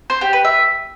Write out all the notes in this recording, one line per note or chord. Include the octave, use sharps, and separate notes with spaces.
C5
G4
B4
E5